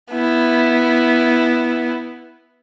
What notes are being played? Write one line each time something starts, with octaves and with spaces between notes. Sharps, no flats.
B3 E4